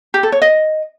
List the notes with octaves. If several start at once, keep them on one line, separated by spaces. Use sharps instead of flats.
G4
A4
C#5
D#5